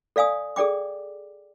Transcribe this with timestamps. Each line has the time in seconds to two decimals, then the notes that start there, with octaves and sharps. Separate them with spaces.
0.16 A4 D5 F5 G#5 D#6
0.56 G#4 A4 D5 G5 D6